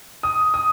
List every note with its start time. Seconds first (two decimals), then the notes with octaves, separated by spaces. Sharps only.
0.23 D#6
0.54 D#6